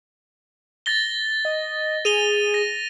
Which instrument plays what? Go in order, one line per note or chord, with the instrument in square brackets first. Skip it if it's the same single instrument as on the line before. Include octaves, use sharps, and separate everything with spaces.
[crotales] A6 A#6 G7
[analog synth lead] D#5
[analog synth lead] G#4 [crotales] D#7 F7 G7
[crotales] A#6